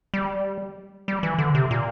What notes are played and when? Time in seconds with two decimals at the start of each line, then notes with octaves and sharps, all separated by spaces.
0.14 G3
1.08 G3
1.23 E3
1.38 D3
1.55 C3
1.71 A#2